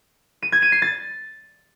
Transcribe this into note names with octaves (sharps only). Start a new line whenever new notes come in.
D#7
G#6
D#7
C7
A6